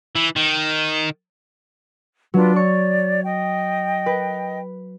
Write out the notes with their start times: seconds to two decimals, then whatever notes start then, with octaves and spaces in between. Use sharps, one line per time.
0.16 E3
0.36 D#3
2.34 F#3 D4 F4 B4
2.56 C#5 D5 C#6
3.25 D#5 G5
4.06 B4